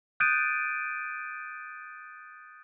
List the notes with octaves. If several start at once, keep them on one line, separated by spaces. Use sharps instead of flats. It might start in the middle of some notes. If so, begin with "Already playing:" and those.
D#6 F#6 G6 A6 D7 D#7